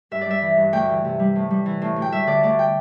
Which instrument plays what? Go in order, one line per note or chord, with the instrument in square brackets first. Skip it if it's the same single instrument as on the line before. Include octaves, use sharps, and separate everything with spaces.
[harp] G2 E5
D5
G3 E5
E3
G2
D2 G5
E3
C3
G3
A2
G3
E3
A2
D2
G5
G3 E5
D3 D5
D2 D5
G5